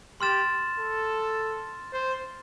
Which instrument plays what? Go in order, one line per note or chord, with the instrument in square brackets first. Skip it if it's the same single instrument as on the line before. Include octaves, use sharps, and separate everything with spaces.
[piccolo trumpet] G4 [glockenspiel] C6 F6 A6 E7
[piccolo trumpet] A4
C5